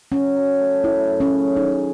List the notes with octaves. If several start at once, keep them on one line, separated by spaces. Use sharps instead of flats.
F#3 C#4
F#3
A3
F#2 E4
F#2
C#4
C#3
D#4 G#4